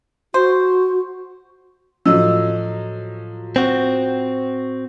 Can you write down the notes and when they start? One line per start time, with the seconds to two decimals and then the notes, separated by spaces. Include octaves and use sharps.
0.34 F#4 C5
2.06 A2 F3 F#3 D#5 E6
3.56 C4 F#4